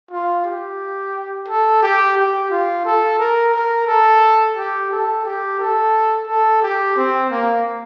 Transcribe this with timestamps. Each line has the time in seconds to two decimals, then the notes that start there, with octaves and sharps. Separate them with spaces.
0.11 F4
0.45 G4
1.48 A4
1.82 G4
2.17 G4
2.51 F4
2.85 A4
3.19 A#4
3.54 A#4
3.87 A4
4.56 G4
4.91 A4
5.25 G4
5.59 A4
6.27 A4
6.62 G4
6.96 C4
7.30 A#3